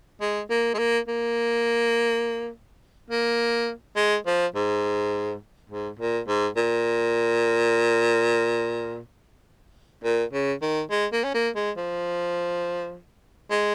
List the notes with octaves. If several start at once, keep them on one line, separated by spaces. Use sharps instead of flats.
G#3
A#3
G#3
A#3
A#3
A#3
G#3
F3
G#2
G#2
A#2
G#2
A#2
A#2
C#3
D#3
G#3
A#3
C#4
A#3
G#3
F3
G#3